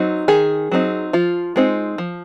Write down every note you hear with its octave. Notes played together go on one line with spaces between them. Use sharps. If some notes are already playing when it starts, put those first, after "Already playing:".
Already playing: F#3 C4 D#4
D#3 G#4
F#3 C4 D#4
F3 F4
G#3 C4 D#4
F3